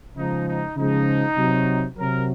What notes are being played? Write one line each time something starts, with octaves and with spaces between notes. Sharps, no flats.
C#3 F3 G#3 D#4
D#4
C#3 F3 G#3 D#4
C3 F#3
C3 F#3 A#4